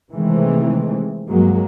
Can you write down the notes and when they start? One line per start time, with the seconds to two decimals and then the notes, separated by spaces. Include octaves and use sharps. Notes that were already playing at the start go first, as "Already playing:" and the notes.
0.11 C3 D#3 E3 G#3 A3 C4
1.29 G2 F#3 G#3 A#3